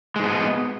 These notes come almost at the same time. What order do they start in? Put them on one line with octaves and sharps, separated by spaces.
G#3 G#2 B3